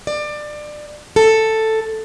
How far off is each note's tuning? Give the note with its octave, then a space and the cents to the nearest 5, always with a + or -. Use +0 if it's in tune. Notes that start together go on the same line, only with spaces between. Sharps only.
D5 +25
A4 +5